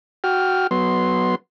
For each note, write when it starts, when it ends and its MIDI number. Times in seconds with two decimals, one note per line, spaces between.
0.24 0.67 66
0.24 0.67 79
0.24 0.67 89
0.71 1.35 54
0.71 1.35 59
0.71 1.35 84